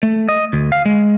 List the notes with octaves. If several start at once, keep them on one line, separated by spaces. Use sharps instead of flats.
A3
D#5
D2
F5
G#3